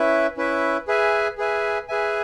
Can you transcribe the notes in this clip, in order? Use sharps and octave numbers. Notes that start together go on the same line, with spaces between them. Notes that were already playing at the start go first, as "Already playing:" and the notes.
Already playing: C#4 E4 B4 E5
C#4 E4 B4 E5
G#4 B4 E5 G#5
G#4 B4 E5 G#5
G#4 B4 E5 G#5